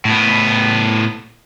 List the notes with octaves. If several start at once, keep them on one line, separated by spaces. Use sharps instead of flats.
A2 B3